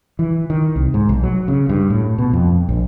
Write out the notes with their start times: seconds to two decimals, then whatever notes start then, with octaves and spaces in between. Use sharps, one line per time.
0.19 E3
0.50 D#3
0.76 C2
0.94 G#2
1.09 B1
1.24 F#3
1.48 C#3
1.69 G2
1.90 A2
2.18 B2
2.33 F2
2.69 A#1